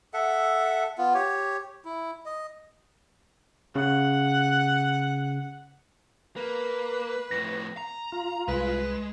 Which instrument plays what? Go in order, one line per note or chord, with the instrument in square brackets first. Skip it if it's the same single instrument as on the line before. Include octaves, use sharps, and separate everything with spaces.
[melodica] A4 E5 F#5
B3 F4
G4 C#5
E4
D#5
[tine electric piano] C#3 [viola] F#5
[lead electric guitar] A#3 [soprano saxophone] B4
[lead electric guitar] F2 A2 [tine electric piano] A#6
[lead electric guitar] A#5
[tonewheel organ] F4
[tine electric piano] C2 [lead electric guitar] G#3 [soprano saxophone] B4